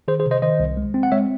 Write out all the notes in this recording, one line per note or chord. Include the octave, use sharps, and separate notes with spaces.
D#3 G#4 C5
G#4 C5
C3
C5 D#5
D#3 C5 D#5
C2
G#3
C4
F#5
G#3 C#5 E5